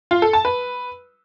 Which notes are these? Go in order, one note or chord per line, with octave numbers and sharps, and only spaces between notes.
F4
A4
A5
B4